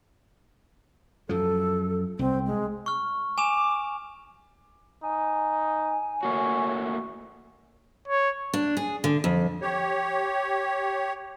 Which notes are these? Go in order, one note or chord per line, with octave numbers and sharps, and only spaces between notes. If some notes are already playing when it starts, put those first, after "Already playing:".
F#2 F3 A4
C2 C4
G#3
C#6 F6
G#5 D6 E7 F7
D#4 G#5
A3 A#3 F#4 C#5
C#5
D4
G#4
D3
F2
G4 C#5